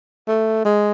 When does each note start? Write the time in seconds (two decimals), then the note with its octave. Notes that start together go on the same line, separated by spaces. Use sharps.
0.28 A3
0.65 G#3